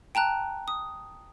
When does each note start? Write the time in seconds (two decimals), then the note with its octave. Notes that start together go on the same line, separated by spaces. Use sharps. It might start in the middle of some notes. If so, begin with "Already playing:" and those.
0.15 G5 A5 A#5 F#6
0.68 D#6